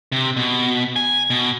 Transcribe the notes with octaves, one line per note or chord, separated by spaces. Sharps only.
C3
B2
G#5
B2